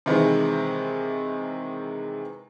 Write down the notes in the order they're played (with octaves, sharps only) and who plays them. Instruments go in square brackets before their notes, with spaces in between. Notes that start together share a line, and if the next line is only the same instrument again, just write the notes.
[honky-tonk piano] C3 D#3 E3 G#3